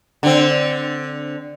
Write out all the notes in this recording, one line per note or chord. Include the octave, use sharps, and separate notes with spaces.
D3 C4